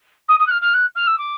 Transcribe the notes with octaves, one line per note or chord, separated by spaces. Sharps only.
D#6
D#6
F#6
F6
F6
F#6
F6
E6
D6